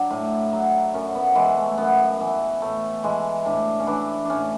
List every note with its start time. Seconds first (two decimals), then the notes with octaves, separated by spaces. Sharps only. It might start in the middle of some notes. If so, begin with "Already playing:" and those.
Already playing: F#3 D4
0.11 A2
0.53 F#3
0.94 F#2 C#4
1.15 B3
1.35 E3 G#3
1.57 A3
1.78 F#2 B3
2.20 E3
2.62 A2 A3
3.04 E3 G#3
3.45 A2 D4
3.80 C#4
3.87 E3 D4
4.25 A2 C#4 D4